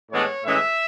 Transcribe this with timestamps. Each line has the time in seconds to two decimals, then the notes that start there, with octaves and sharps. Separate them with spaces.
0.11 A2 E3 G#3 B3 D4 C#5
0.44 A2 E3 G#3 C#4 E5